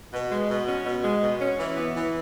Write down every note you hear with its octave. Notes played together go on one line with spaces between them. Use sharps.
B2
G#3
B2
C#4
B2
G#3
B2
C#4
E3
B3
E3